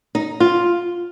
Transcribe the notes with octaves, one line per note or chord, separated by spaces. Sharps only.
D#4
F4